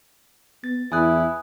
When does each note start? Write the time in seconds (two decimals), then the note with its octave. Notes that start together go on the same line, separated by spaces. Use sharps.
0.64 B3 A6
0.92 E2 E4 G#5 D#6 F#6